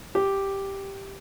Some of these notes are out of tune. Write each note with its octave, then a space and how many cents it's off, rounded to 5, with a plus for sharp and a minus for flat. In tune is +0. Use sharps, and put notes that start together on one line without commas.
G4 +0